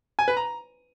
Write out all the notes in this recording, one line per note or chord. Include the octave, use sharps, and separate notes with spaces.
G#5
B4
A#5